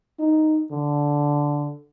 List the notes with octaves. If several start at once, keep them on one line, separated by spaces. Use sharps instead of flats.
D#4
D3